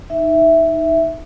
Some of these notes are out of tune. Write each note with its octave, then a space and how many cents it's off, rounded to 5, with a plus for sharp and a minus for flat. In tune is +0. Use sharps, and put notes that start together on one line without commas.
D#4 +0 E5 +0